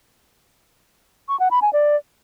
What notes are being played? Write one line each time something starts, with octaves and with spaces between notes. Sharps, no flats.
C#6
F#5
B5
G#5
D5